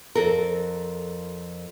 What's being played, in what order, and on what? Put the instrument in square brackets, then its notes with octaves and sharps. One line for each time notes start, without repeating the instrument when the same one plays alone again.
[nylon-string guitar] F2 A4 A#4